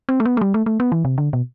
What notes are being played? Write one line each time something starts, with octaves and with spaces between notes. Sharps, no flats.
C4
A3
B3
A3
G3
A3
A3
B3
E3
C3
D3
B2